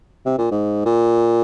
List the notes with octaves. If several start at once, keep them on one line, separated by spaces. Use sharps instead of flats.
C3
A#2
G#2
A#2